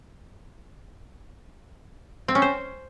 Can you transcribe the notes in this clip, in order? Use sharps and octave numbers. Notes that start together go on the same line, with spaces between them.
C4
C#4
C5